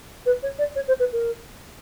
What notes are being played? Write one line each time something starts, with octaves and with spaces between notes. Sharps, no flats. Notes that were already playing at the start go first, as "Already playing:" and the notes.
B4
C#5
D5
C#5
C5
B4
A#4